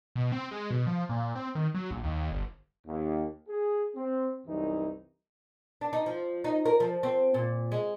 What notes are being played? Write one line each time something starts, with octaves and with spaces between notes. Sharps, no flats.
B2
C4
G#3
B2
F3
A#2
C4
D#3
F#3
A#1
D#2
G1
D#2
G#4
C4
C2 F#2 E3 D#4
D4
D#4
F3
D#4
A#4
F3
C4
A#2
G#3